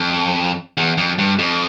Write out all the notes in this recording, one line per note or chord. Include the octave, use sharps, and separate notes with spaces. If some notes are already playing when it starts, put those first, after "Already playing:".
Already playing: F2
E2
F2
G2
F2